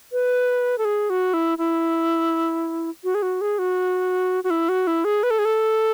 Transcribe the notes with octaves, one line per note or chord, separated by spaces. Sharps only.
B4
A4
G#4
F#4
E4
E4
F#4
G#4
F#4
G#4
F#4
F#4
E4
F#4
E4
G#4
B4
A4
G#4
A4